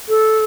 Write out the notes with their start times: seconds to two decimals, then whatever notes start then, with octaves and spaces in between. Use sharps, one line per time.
0.09 A4